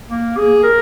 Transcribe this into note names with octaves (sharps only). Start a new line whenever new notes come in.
A#3
G#4
A#4